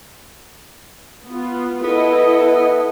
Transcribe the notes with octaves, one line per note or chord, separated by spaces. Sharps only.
B3 F4
B3 E4 A4 D#5